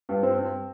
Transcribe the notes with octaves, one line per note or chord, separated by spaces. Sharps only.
G2
C4 C5
C4